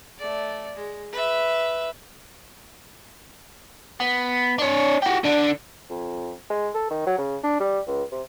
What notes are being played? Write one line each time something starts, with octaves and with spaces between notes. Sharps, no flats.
A3 D5
G#3
B4 E5
B3
D4 C#5
F#4 G4
D3 D4
F2
G#3
A4
D#3
F#3
C#3
D4
G3
C#2
C3